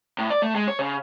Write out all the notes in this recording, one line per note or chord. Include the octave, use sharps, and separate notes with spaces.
A2
D5
A3
G#3
C#5
C#3